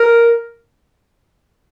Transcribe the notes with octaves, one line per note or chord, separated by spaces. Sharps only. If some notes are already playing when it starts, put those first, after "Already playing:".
Already playing: A#4